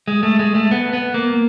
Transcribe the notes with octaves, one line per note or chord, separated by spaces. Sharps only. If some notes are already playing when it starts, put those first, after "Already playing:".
G#3
A3
G#3
A3
B3
B3
A#3